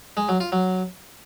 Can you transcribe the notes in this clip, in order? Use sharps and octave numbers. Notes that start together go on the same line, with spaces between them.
G#3
F#3
F4
F#3